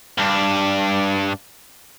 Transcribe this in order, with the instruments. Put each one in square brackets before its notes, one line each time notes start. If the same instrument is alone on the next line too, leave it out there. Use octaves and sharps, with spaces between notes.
[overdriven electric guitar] G2 D4